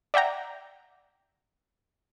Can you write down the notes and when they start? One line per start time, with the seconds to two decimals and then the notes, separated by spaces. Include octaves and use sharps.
0.14 D5 E5 F#5 G5 A#5